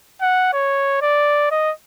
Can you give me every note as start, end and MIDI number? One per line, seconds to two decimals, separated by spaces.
0.22 0.53 78
0.53 0.97 73
1.02 1.47 74
1.51 1.72 75